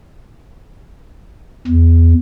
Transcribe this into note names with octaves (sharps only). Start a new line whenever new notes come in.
E2